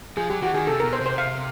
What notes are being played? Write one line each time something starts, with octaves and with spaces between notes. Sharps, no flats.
F3 G#4
F#3 G4
E3 F#4
D#3 G#4
C3 A4
B2 A#4
C5
C3
C5
F5